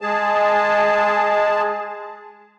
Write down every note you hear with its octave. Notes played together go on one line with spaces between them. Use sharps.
G#3 G#4 A5